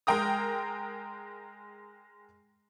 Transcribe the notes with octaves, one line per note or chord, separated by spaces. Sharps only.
G#3 A#4 G5 A#5 D#6